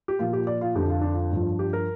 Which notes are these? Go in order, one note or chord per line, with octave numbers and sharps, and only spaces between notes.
G4
A#2 F3 F4
G4
D5
F4
F2 D3 F3 G4
F4
D4
F4
G2 F3
G4
A#4